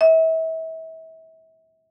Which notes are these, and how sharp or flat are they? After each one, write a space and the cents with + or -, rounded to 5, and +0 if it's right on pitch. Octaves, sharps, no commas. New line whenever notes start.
E5 -35